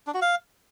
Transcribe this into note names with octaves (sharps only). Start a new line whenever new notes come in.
D4
F#4
F5